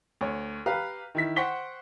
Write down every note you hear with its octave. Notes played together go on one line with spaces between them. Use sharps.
D2 C#5
G4 B4 F5 A#5
D#3 E4 B6
C5 F#5 G5 C#6 B6 G7